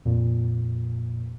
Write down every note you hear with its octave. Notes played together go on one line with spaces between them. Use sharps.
F2 A#2